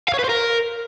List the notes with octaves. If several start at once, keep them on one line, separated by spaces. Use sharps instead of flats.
F5
C#5
B4
C5
A#4